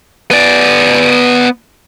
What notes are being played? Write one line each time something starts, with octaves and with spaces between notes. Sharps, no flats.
B3 D5